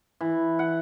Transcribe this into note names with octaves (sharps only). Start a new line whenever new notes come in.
E3
F#5